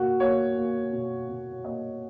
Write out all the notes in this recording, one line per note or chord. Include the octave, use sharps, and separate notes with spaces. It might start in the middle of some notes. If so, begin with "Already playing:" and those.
Already playing: B2 A#3 F#4
A#3 C#5
A#3
B2
B2
A#3 D#5